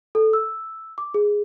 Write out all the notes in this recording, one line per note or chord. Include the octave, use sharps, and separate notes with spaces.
A4
E6
D6
G#4